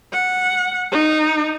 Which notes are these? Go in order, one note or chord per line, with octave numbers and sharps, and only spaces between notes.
F#5
D#4